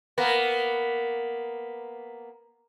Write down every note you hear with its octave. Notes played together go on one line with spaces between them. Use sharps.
A#3 B3